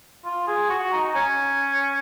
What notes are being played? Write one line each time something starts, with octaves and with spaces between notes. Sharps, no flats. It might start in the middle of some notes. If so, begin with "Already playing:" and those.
F4
G#4
F#4
D#4
C#4